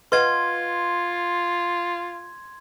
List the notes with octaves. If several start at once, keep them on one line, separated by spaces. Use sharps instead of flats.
F4 B4 D#5 F#5 C6 G#6